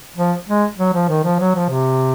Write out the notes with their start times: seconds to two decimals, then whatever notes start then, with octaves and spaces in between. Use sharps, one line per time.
0.17 F3
0.48 G#3
0.78 F#3
0.94 F3
1.10 D#3
1.24 F3
1.40 F#3
1.55 F3
1.70 C3